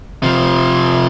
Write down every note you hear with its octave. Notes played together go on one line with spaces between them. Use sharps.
C3 F3